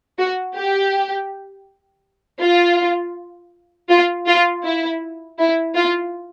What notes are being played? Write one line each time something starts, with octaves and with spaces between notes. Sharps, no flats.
F#4
G4
F4
F4
F4
E4
E4
F4